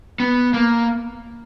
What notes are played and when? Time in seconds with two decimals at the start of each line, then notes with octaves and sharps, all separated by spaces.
0.20 B3
0.54 A#3